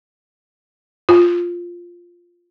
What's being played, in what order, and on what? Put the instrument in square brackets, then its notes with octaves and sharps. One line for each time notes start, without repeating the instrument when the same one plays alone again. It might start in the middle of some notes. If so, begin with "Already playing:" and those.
[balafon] F4